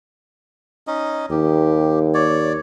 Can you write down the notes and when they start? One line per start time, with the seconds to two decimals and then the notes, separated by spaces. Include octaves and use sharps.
0.87 C#4 D#4 D#5
1.30 D#2 G4
2.14 C#5 D5